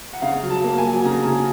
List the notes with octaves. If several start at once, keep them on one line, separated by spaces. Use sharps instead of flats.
F#5
C#3 F5
F#3
A5
A#3
G#5
F#3
C#3 A#5
C#3